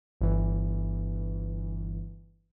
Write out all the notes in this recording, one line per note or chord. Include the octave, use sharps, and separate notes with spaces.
G1 G2 E3